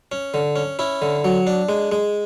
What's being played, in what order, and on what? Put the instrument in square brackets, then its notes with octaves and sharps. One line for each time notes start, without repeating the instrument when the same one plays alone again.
[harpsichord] C#4
D3
C#4
C#4 E4
D3
F#3
D4
G#3
G#3